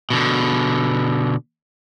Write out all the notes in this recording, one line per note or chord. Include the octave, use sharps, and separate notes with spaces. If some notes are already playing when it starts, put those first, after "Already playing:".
B2 D3